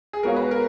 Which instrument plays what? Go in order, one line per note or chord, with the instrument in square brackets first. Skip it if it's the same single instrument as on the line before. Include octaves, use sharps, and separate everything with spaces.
[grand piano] G#4
[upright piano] G#3 B3 F#4 C#5 F5 [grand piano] A#4
[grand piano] B4
A#4